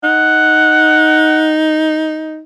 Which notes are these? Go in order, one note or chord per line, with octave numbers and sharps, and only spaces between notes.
D#4 F#5